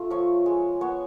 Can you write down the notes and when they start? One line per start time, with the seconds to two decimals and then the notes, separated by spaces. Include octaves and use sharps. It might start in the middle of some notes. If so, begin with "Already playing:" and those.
Already playing: A3 F4
0.10 F3 C#5
0.46 G#3
0.81 B3 C#5